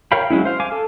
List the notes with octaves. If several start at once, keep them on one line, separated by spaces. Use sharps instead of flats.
A#4 C#5 F5 G5 B5
F#3 G#3 C#4 E4
C5 F5
F5 G#5 D6
A4